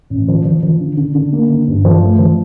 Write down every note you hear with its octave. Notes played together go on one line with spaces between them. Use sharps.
A1
F3
F3
F3
D3
D3
D3
A#3
D3
G2
F3
A3
F3